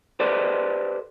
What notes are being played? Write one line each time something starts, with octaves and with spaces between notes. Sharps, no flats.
G4 A4 B4 C5 D5